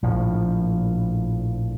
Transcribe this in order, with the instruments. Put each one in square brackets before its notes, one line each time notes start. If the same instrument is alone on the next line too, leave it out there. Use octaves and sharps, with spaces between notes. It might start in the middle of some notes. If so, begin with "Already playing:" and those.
[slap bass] A#1 A2 F3